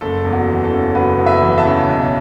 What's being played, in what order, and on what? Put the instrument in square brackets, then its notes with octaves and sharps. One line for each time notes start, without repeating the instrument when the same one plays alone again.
[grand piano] F#1 A4
E2
F#4
E3
A4
C#3
F#1 F#4 B4
E2
B4 E5
E3
E5 A5
C#3
B1